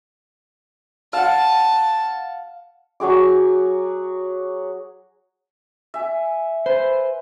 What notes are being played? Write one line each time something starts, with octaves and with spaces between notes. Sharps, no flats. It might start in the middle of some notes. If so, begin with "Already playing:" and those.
F5 F#5 A5
F#3 F#4 G#4 D6
E5 G#5
B4 C5